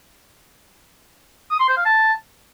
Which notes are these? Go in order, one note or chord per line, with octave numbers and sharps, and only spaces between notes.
D#6
C6
C5
F5
A5